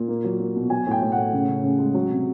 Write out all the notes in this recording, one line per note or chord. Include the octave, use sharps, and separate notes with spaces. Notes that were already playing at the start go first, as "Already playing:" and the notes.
Already playing: A#2
A#3
F#3
A#3
B2
F#3 G#5
A2 G5
A2
F#5
A2
C#3
C#3
C#3
G#3
F#3
C3